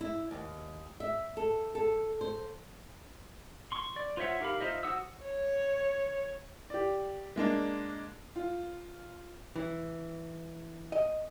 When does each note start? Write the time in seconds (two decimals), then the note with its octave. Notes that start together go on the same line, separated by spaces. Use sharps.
0.01 E4
0.31 D#2
1.00 E5
1.37 A4
1.75 A4
2.21 C5
3.72 C6 C#6
3.96 D5
4.17 F4 C5 C#5 E5 F#5
4.40 D#4 G4 A#4 F5 B5
4.60 D#4 F4 C5 D#5 E5
4.83 F#4 C5 F#5 D#6 E6
5.24 C#5
6.70 G4 D5
7.36 G#3 A#3 D4
8.36 F4
9.56 E3
10.92 D#5